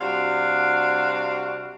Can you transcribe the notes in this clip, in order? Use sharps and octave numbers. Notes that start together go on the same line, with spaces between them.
C3 G3 D4 F#4 F5